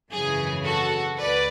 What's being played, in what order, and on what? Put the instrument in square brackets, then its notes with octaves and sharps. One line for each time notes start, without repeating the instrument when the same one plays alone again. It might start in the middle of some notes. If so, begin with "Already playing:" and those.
[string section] G#1 F#2 C#3 E3 G#4
F#4 A4
C#2 B4 D5